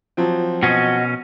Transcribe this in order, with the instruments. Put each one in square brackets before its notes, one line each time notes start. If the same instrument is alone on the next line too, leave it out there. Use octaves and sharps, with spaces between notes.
[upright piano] F3 F#3 C4
[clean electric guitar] B2 C#4 [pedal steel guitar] F#4 D#5